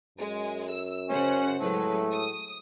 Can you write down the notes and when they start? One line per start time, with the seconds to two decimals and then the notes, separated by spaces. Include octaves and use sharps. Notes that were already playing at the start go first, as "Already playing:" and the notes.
0.18 F#2 G#3
0.71 E6
1.09 C#3 C#4 C5 F#5
1.60 A2 F#3 G#3 A3 B4
2.11 D#6